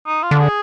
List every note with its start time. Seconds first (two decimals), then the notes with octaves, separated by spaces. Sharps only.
0.07 D#4
0.23 F4
0.31 D3
0.40 G#4